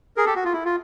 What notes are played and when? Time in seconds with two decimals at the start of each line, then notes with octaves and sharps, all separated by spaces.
0.17 G#4 A#4
0.26 G4 A4
0.36 F#4
0.45 F4
0.53 E4
0.65 F4